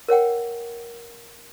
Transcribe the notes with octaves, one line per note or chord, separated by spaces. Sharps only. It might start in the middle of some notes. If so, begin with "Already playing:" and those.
A#4 C#5 F#5 G5